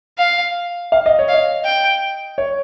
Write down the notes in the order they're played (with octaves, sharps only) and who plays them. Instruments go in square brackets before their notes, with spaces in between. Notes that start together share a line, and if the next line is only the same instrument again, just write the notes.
[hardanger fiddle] F5
[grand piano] F5
D#5
C#5
[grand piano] D#5 [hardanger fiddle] F5
[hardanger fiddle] G5
[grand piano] C#5